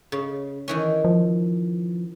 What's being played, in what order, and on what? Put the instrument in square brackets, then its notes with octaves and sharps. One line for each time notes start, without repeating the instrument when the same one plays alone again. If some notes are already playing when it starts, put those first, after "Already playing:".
[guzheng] C#3
D#3 E3 C#4
[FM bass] F3